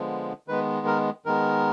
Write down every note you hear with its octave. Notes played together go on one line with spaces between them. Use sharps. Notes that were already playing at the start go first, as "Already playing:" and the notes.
Already playing: D3 F3 G#3 B3
D#3 G#3 B3 B4
A#4
D#3 G#3 B3 A#4